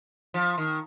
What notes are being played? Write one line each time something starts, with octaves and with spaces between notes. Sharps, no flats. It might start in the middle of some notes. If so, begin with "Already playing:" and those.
F3
D#3